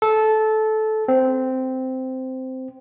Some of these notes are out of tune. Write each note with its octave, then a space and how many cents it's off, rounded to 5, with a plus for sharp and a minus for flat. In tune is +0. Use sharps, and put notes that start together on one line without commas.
A4 -15
C4 -10